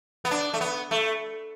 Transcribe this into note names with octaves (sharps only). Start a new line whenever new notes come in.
B3
D4
A3
B3
A3